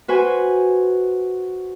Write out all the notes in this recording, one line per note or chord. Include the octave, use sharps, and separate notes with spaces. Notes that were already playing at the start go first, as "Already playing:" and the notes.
F#4 B4 C5 G#5